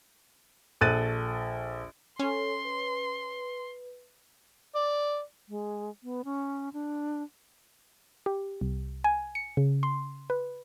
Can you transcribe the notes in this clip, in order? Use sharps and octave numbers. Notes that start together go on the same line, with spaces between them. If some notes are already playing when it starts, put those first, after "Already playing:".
A#1 A4 F#6 A6 D#7
C#4 A4 C#5 C6
B4
D5
G#3
B3
C#4
D4
G4
C2
G#5
C#7
C#3
C6
B4